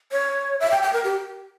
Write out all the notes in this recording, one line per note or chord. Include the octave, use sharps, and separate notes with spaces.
C#5
E5
G5
G5
A#4
G4